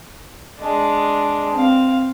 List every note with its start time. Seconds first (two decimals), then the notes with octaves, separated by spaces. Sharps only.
0.59 G#3 D4
1.53 C4 F5